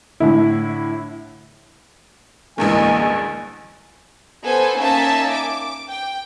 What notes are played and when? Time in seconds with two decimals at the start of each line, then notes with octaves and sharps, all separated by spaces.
0.20 A2 D3 E4
2.58 A1 D2 G2 E3 G#3 A#3 G#5
4.44 B3 A4 C5 G#5
4.77 A#3 C#4 D#4 E5 G#5 A5
5.31 D6
5.91 G5